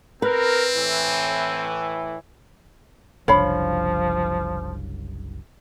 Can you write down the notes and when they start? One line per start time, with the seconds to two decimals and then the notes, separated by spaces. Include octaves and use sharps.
0.22 C4 A#4 B4
0.75 A2 E3
3.28 F#1 C2 F3 D4 C#5 F5 B5